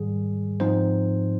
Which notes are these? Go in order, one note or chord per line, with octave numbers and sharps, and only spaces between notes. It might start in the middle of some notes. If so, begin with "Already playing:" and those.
Already playing: G#2 D#3 G3 G#4
G#2 F3 C4 D#4 C5